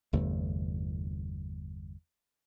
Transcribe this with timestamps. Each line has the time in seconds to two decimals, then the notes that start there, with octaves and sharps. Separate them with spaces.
0.13 G1 E2 C3 A3